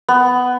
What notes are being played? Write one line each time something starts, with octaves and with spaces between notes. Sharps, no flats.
B3